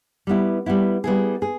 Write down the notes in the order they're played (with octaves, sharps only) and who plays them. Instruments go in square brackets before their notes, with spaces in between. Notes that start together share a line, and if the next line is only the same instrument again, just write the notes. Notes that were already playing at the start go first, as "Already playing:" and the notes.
[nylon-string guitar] G3 B3 E4
G3 B3 E4
G3 B3 E4 G#4
G#4